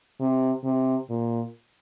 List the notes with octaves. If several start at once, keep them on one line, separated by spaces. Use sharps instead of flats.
C3
C3
A#2